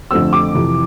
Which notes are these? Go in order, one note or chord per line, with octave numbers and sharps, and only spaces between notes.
F2 D3 A3 C4 E6
D6
F2 C3 E3